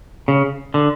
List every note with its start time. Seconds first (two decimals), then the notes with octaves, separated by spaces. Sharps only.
0.28 C#3
0.74 D3